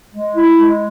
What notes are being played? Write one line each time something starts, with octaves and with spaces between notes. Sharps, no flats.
G#3
E4
G#3